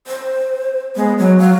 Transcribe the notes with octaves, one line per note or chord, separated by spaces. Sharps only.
C5
G#3 B3
F#3 C#5
F#3 F5